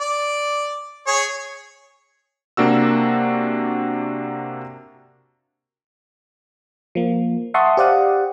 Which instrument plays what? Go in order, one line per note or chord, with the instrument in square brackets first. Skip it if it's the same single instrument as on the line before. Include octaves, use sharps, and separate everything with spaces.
[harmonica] D5
G#4 C#5
[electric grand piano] C3 A#3 D4 F#4 E6
[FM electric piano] F3 A#3
E5 F#5 A5 C6 C#6 D#6
G4 C5 D5 F5 F#5 D#6